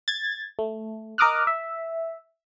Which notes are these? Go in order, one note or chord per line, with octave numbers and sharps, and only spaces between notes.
G#6 A6
A3
A#4 D#5 D6 D#6 F6 F#6
E5